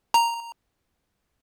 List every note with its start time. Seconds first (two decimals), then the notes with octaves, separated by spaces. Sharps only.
0.14 A#5